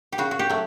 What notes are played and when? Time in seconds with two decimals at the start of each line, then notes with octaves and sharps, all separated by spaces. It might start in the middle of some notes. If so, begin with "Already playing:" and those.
0.12 G4
0.18 C#3 F#4
0.31 F#4
0.39 G4
0.50 F#3 A3